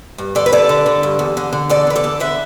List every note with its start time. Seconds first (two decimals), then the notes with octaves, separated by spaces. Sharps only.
0.18 G2
0.35 D3 A4 D5
0.46 B4
0.52 D3 A4 D5
0.69 D3
0.86 D3
1.03 G2
1.19 E2
1.37 D3
1.53 D3
1.70 E2 A4 D5
1.87 D3 B4
1.96 A4 D5
2.04 E2
2.20 D3 B4 E5